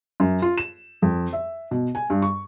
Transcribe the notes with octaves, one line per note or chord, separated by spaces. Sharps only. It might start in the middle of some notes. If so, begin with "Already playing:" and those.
F#2
F4
E7
F2
E5
B2
G#5
G2
C#6